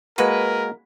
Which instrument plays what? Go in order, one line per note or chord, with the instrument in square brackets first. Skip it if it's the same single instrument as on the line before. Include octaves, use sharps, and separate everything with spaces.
[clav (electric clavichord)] G#3 A#3 F#4 [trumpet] A#4 [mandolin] B4